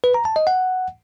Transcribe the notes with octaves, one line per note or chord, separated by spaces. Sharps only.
B4
A#5
A5
D#5
F#5